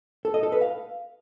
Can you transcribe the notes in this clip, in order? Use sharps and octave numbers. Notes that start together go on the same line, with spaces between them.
A4
D#5
A4
B4
F5